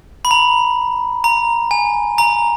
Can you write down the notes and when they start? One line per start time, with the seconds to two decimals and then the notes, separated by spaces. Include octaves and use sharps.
0.25 B5
0.31 A#5
1.24 A#5
1.71 G#5
2.18 A#5